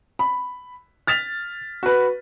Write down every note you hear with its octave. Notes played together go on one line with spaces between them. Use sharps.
B5
F6 A6 B6 F7
F#4 B4